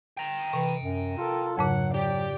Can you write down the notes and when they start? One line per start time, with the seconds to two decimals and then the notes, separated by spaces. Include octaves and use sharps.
0.18 G5 A#5
0.53 C3 E3
0.83 F#2
1.18 F4 A4 A#4
1.57 F2 G#2 C#3 F#3 F#5
1.94 F#3 G4 D5